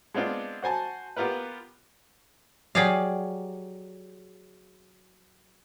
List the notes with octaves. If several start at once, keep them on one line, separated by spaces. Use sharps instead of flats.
G#3 B3 C4 D4 F4
F#4 C5 G#5 A5
B3 F4 G4 A#4 B4
F#3 G4 G#4 D5 F5